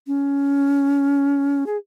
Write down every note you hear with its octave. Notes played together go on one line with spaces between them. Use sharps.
C#4
G#4